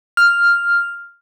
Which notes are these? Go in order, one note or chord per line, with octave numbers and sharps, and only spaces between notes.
F6